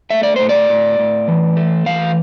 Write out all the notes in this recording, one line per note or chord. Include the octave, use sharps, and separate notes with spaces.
A3 E5
D5
A2 C5
D5
A2
A2
E3
A3
E3 F5